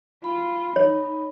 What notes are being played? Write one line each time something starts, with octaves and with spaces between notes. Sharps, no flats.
F4 B5
D#4 C#5